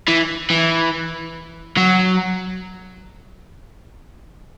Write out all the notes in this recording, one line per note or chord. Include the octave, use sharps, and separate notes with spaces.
E3
E3
F#3